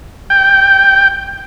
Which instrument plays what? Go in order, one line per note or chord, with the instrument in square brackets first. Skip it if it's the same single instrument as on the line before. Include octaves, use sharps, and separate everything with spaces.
[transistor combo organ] G5